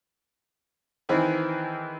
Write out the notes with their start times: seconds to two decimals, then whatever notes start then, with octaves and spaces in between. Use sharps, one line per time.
1.09 D#3 E3 C4 E4 G#4 B4